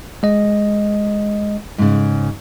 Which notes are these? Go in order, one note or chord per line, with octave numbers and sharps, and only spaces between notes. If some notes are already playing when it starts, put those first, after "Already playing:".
G#3 D#5
G#2 C#3